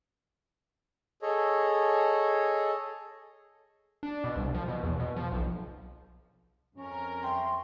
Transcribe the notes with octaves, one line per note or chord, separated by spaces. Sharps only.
G#4 A4 C#5 D#5
D4
B2
C2
F3
B2
E2
B2
F3
B1
F2 C#4 A#4
E5 G5 C6